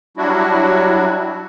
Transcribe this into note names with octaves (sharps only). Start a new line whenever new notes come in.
F#3 G3 D4 E4 F#4